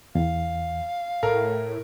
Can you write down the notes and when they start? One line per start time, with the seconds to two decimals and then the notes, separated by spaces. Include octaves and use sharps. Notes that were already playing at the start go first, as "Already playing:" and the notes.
0.15 E2 F5
1.23 A2 A4 A#4